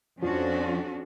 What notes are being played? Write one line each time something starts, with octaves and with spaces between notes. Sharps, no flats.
F2 F3 C#4 D4 F#4